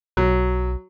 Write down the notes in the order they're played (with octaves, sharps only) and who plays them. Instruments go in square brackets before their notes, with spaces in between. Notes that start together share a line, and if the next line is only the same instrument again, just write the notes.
[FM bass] B1 [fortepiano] F#3